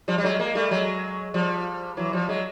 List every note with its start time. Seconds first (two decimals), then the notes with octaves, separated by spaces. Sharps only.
0.08 F3 G3
0.18 G3
0.24 F#3 G#3
0.39 G#3 A#3
0.55 G3 A3
0.71 F#3 G#3
1.34 F3 G3
1.97 E3 F#3
2.13 F3 G3
2.29 F#3 G#3